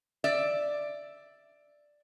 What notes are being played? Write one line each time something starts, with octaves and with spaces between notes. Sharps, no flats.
D5 E5